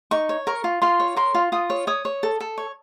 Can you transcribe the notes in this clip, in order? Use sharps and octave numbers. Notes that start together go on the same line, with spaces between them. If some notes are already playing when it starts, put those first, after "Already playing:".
D#4 C#6
C#5
A#4 C#6
F4
F4 C6
C#5
A#4 C6
F4
F4 D#6
C#5
C#5 D#6
C#5
A4
A4
C#5